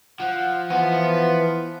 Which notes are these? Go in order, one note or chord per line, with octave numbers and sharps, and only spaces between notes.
F3 F#5
E3 F3 B3 F#5